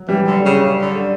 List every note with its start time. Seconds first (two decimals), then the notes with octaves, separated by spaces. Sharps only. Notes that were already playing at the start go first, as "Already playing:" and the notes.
Already playing: F#3
0.08 E3 G3
0.27 D3
0.45 C#3
0.81 D3